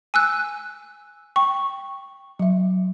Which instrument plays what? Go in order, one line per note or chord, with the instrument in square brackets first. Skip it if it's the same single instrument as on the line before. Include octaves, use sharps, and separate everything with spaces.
[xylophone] G#5 E6 F#6
[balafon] G5 [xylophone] C#6
[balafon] F#3 E5